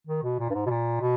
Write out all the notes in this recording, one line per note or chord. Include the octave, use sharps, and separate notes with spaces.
D#3
B2
A#2
G2
G#2
B2
A#2
B2